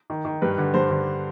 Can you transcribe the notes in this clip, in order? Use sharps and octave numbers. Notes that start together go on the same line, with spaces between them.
D#3
D#3
G2 B4
D3
G2 C5
D3